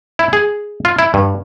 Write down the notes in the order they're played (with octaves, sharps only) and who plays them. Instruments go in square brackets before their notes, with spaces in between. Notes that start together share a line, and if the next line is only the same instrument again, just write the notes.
[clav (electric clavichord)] E4
G#4
F4
E4
G2